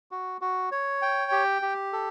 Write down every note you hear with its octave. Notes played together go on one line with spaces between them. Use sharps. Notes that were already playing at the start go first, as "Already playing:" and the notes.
F#4
F#4
C#5
G5
G4
G4
A4